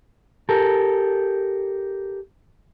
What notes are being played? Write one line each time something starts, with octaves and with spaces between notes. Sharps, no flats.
G4 A4 A#4